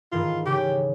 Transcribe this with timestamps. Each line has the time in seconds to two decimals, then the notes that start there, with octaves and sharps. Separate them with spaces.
0.12 G#2 D#3 E3 F4
0.46 C#3 G4